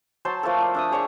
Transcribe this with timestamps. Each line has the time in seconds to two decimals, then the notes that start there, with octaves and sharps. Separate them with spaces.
0.25 F#3 C5 A5
0.43 F3 A3 A#3 A4
0.61 D5
0.75 D4 E5 D#6
0.91 G#4 C#5 D5 C#6